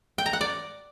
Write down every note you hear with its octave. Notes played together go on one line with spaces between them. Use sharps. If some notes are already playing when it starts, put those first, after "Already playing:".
G5
A#5
F#5
D5